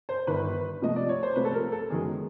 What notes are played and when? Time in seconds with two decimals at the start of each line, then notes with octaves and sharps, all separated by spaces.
0.09 C5
0.27 G1 G2 D#3 B4
0.82 C2 C3 F3 A3 D#5
0.96 D5
1.09 C#5
1.23 C5
1.36 C2 C3 F3 A3 B4
1.45 A4
1.54 A#4
1.72 A4
1.90 F#2 D#3 G#3 B3 G#4